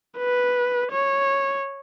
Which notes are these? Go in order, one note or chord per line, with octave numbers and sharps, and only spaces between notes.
B4
C#5